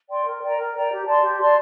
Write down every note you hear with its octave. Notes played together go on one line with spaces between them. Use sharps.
D5 G5 C6
A#4
D5 G5 A#5
A#4
D5 G5 A#5
G4
D5 A5 C6
G4
D5 A5 C6